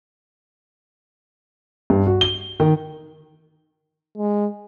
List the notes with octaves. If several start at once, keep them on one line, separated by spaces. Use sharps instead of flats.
G2
F#4
G7
D#3
G#3